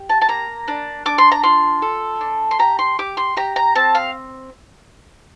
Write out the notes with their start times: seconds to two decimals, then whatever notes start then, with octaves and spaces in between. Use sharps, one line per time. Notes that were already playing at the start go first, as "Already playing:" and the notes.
Already playing: G4
0.09 A5
0.21 A5
0.28 A#3 A#5
0.68 D4
1.06 D4 D6
1.18 C6
1.32 A#5
1.43 F4 C6
1.82 A4
2.21 D4
2.51 C6
2.59 G4 A#5
2.79 C6
2.99 G4 D6
3.17 C6
3.37 G4 A#5
3.56 A#5
3.75 C4 A5
3.95 F5